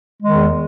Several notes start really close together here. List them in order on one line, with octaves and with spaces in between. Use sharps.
G#3 D#3 E2